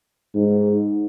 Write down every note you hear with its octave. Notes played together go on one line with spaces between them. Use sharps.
G#2